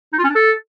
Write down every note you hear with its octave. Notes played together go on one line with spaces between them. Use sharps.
D#4
F4
C#4
D4
A4